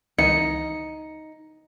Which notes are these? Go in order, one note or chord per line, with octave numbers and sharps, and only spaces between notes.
C#2 D#3 E3 D#4 C#7